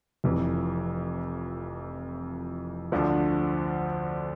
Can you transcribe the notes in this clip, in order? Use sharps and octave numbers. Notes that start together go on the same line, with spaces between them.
F1 F2 E3
D2 D3 F3